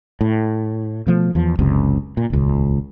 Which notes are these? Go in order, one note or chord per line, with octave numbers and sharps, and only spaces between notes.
A2
B2 F3 A3
E2 F3
F#1 C#2 F#2 C3
A#2
D#1 C#2